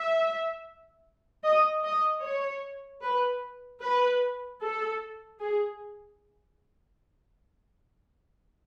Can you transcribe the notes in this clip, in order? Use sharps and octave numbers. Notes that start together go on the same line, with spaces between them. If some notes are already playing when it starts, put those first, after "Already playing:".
Already playing: E5
D#5
D#5
C#5
B4
B4
A4
G#4